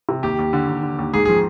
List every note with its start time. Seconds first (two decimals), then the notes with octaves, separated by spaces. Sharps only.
0.09 C3
0.23 D#2 G4
0.39 D#2
0.53 D3
0.68 D#2
0.83 D3
0.99 D#2
1.14 G#2 G#4
1.25 F3 G#4